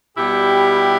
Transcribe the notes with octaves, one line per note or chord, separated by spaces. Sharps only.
B2 G3 E4 G4